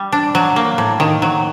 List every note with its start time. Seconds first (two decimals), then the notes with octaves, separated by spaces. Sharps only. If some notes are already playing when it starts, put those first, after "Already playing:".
Already playing: G3
0.12 D4
0.35 F#3
0.56 A#3
0.78 A2
1.00 D#3
1.22 F#3